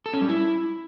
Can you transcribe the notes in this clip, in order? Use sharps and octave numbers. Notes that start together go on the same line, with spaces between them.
A4
C#4
G3
E4